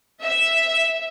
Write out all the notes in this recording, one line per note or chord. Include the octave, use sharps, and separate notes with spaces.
E5